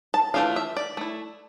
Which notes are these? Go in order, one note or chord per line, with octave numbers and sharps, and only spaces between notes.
A5
E3 A3 D4 F4 F5
E5
D5
A3 E4